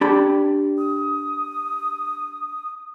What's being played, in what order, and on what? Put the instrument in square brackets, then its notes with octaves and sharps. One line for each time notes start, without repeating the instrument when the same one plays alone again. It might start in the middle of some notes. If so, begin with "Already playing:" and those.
[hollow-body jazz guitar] D4 G4 B5
[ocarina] D#6